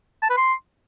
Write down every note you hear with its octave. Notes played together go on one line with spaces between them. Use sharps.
A5
B4
C6